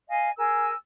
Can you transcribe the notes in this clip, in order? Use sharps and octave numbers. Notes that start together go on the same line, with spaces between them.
D#5 F5 G#5
G#4 A#4 G#5 E6